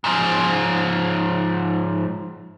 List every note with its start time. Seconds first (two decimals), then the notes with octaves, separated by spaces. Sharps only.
0.04 G#2 F3